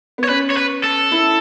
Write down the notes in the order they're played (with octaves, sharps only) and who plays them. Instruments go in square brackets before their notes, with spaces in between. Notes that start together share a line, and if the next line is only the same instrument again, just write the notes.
[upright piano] B3
[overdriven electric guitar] C#5
[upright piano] C#4 [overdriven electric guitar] B4
[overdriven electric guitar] C#5
B4
A4
[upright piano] E4